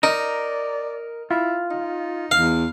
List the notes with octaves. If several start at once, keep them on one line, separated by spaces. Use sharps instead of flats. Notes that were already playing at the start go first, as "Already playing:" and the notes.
D#4 A#4 D5
E4 F4
D#4
E2 F5